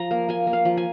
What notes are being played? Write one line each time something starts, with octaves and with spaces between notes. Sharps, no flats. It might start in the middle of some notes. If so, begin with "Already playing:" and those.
Already playing: F3 A#5
A#3
A#3 G#5
A#3
F5
F3
G#5